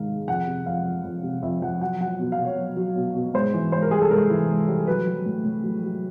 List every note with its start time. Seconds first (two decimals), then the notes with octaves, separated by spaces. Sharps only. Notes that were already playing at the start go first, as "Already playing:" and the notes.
Already playing: G#2 D#3 F5
0.09 G#3
0.28 F2 F#5
0.47 C3
0.66 F2 F5
0.85 F3
1.04 F2
1.23 C3
1.42 F2 E5
1.62 F3 F#5
1.81 F#3 F#5
2.00 F#3 F#5
2.19 B2
2.32 F5
2.38 B2
2.45 C#5
2.58 F#3
2.76 F#3
2.96 B2
3.15 B2
3.34 G#2 C5
3.54 E3
3.72 G#2 C5
3.82 A#4
3.91 G3 G#4
4.02 A4
4.11 G#2 A#4
4.30 E3
4.49 G#2
4.68 G3
4.87 F#3 B4
5.07 F#3
5.26 A2
5.45 A2
5.63 F#3
5.83 F#3